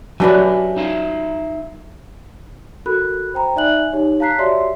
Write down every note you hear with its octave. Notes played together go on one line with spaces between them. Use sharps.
F#3 D4 G4 B4 E5 G#5
D#4 E5 F5
F#4 A4 A#4 B5 F#6
C5 G5 A#5 B5
D#4 D5 E5 G#5 F#6 F#7
D#4 G4 C#5
F5 A5 A#5 F#6 B6 C7
F#4 G4 C#5 D5 E5 C6